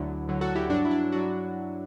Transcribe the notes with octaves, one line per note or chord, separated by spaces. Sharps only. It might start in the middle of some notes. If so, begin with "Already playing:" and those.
Already playing: D2 D3 F#3 E4
D2 D3 F#3
F#4 A4
E4 G4
G2 F#3 D4 F#4
E4
D4
F#3 D4 F#4